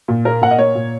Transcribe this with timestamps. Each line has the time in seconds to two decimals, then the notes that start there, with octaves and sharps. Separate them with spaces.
0.08 A#2
0.25 A#3 A#4
0.41 A#2 F#5
0.51 D#5
0.58 A#3 C#5
0.75 A#2